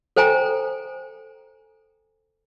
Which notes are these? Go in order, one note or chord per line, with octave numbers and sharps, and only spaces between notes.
A4 C5 G5 G#5 A#5